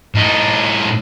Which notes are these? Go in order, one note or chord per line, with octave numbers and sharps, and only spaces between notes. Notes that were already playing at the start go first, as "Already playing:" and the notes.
A2 D#4